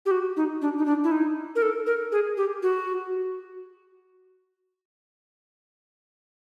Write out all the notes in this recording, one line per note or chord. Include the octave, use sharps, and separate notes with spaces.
G4
F#4
D#4
D4
D#4
D4
E4
D#4
A#4
A4
A#4
G#4
G4
F#4